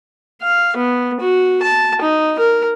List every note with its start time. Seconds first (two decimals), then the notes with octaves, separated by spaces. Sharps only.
0.42 F5
0.76 B3
1.20 F#4
1.62 A5
2.01 D#4
2.39 A#4